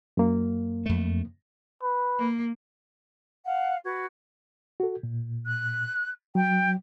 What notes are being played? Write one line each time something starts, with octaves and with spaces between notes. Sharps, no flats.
F#2 A#3
F2 A3
B4
A#3
F5 F#5
F#4 B4 G#6
F#4 A4
A#2
F#6
F#3 G5